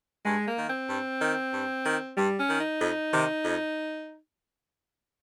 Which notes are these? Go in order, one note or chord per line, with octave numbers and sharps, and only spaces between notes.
G2 G#3
A#3
D#3
C4
G2
D#3
G2
D#3
G2 G3
C#4
D#3
D#4
F2
C3 D#3
F2